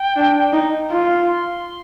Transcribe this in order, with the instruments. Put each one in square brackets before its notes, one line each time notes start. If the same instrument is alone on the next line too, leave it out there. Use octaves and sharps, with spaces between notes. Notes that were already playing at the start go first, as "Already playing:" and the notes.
Already playing: [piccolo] G5
[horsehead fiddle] D4
D#4
F4
[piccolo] C6